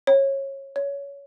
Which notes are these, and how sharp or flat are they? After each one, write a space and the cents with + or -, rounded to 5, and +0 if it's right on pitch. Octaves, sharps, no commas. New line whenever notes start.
C#5 -20
C#5 +20